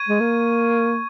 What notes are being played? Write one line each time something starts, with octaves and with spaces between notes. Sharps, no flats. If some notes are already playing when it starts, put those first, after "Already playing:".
Already playing: C#6 G#6 D#7
G#3
A#3